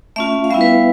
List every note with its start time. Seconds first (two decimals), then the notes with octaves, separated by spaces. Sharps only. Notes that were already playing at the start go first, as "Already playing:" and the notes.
0.16 A3 C#4 F4 E5
0.44 F5
0.50 G3 B3 E4 E5
0.61 B4